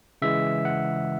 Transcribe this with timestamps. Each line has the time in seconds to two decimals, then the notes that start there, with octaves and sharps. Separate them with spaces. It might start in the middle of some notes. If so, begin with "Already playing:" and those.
0.22 C#3 E3 G#3 E5
0.65 F#5